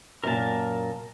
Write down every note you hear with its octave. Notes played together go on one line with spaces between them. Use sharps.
F#2 A#2 A#4 A5